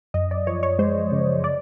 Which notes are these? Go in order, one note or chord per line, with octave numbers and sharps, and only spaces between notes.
F#2 D#5
D5
F3 C#5
C#5
G#3 C5
C#3
D5